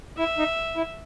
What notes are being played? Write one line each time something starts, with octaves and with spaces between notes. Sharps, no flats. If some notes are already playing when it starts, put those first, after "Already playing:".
E4 E5
D#4
E4